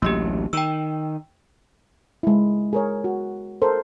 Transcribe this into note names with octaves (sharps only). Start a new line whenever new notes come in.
A1 D2 F#3 A#3 G4
D#3 G5 E6
G#3 E4
G#4 A#4 C#5
F#4
A4 A#4 C5